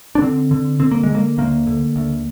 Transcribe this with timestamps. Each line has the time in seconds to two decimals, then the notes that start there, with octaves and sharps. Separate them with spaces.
0.15 D4
0.21 D3 C4
0.51 D3
0.80 D3 C4
0.91 A#3
1.03 G#3
1.09 D3
1.15 A#3
1.38 D2 A#3
1.67 D3
1.96 D2